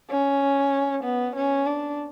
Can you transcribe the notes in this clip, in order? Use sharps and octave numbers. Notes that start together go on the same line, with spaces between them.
C#4
B3
C#4
D4